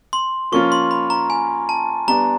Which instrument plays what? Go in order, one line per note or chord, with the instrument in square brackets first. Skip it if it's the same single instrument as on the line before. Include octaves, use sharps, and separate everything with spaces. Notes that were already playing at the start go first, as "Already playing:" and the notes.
[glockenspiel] C6
[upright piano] F3 A#3 C#4 F4 [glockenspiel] C#6
[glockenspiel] C6
B5
A#5
G#5
A5
[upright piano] G3 B3 D4 [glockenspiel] A#5